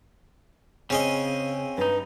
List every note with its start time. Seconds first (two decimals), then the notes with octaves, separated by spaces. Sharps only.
0.90 C#3 C4 C#4 G#4 D#5
1.78 G2 D#4 B4